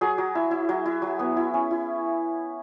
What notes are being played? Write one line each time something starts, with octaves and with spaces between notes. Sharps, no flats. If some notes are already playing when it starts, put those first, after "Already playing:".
F#3 G#4
F#3
E4
E4
F#3
E4
F#3
B3
E4
C#4
E4